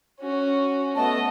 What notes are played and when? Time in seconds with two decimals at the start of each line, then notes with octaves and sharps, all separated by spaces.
0.20 C#4 F#4
0.96 A3 B3 D#5 A5